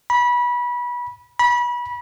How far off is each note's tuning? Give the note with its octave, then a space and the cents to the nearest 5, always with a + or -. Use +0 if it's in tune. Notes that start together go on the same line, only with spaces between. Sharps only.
B5 -25
B5 -30